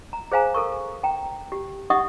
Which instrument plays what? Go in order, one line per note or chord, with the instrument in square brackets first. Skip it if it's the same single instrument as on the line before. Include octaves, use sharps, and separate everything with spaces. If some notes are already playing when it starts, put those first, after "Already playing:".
[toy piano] A#5
G#4 C5 F5 G#5 A#5
A4 A#4 C#6
G5 A#5
G4
D#4 G4 E5 F#5 C#6 D#6